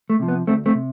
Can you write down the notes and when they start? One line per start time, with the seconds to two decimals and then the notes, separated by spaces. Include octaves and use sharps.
0.10 A3
0.19 C3 F3
0.28 B3
0.47 D2 A3 C4
0.66 A3 C4
0.75 C3